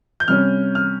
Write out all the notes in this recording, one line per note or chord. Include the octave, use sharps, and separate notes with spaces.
G6
C3 G3 C#4 F6
F6